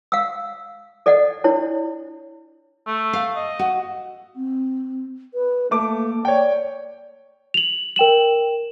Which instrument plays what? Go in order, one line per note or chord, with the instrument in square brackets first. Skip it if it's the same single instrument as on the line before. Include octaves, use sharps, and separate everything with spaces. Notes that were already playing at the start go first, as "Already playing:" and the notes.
[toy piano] F5 F#5 E6
A4 D5 D#5 F#5
D4 E4 C#5
[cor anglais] A3
[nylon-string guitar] F5
[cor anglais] D#5
[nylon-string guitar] F#4
[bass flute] C4
B4
[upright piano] A3 D6 [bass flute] A#3
[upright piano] C#5 G5 [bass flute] D5
[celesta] F7 F#7
A#4 G5 E7 F#7